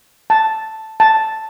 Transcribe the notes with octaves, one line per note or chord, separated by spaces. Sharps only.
A5
A5